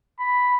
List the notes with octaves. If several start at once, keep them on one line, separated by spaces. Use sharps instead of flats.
B5